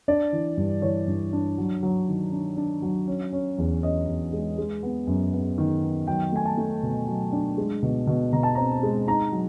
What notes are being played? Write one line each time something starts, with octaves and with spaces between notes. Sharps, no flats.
D4 D5
E3
G2
E3 C#5
G2
D4
F#3
F#3
D#3
D4
D4
F#3
C#4
C#4
E2
C#4 D#5
E2
G#3
G#3
B3
F#2
B3
D#3
B3
F#3 G5
A3 G#5
A5
A3
B2
F#3
D4
G#3
B2
B2
B2 A#5
A5
C4 A#5
G#3
D#4 A#5
F#3